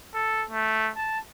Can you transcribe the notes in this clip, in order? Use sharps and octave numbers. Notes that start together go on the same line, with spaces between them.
A4
A3
A5